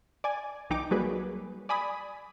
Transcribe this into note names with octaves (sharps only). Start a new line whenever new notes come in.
D5 G#5
B1 E3 D#4 G5 D6
F#3 G3 A#3 G#4 B4
D5 G#5 B5 D#6